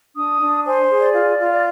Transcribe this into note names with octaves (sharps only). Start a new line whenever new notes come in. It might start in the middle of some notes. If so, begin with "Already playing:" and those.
D4 D#6
D4
C5 G#5
G#4
D5
F4
F4
D5